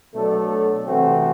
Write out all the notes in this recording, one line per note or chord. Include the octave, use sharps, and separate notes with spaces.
B2 F#3 A3 D4 A4
C3 E3 A3 C4 F#4